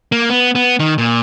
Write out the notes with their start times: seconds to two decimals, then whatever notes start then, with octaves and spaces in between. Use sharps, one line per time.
0.12 A#3
0.30 B3
0.55 B3
0.79 D#3
0.98 A#2